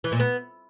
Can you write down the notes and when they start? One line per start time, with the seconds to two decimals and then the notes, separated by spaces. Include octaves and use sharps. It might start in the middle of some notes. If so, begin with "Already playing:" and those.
0.04 E3
0.12 A#2
0.20 B3